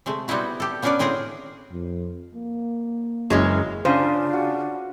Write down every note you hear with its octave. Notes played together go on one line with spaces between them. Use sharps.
C3 G#3 A3
G3 B3 C4 D#4 E4 F#4
G4 A4
B3 C#4 D4 A#4 B4 D5
A2 C4 G#4 A#4 F#5
F2
A#3
F#1 E3 F#3 G#3 C#4
C#3 C#4 D4 F4 C5
F#4